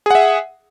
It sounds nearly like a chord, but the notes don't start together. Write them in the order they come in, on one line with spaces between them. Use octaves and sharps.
G#4 F#5 E5